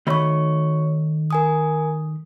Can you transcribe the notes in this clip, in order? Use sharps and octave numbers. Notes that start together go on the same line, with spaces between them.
D#3 A3 F#4 C#5 B5 C#6
A#4 G#5 D#6